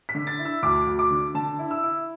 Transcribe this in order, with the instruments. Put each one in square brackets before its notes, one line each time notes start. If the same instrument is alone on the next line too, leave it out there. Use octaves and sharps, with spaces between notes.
[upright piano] B6
D3
A6
E4
E6
D2 D6
D2
D6
D3
D3 A5
E4
E6
E4